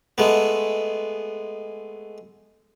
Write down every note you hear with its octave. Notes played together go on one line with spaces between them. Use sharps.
G#3 A3 B3